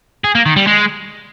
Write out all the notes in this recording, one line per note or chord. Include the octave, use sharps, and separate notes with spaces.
G#4
A#3
D#3
G3
G#3